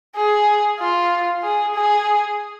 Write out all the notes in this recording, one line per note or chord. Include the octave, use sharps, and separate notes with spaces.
G#4
F4
G#4
G#4